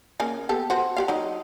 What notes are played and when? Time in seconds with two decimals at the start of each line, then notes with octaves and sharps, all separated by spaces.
0.20 C#3 A#3 G#5
0.49 B3 G4 A4
0.70 F#4 C5
0.97 F#4 G4 F5
1.08 F#3 D#4 D#5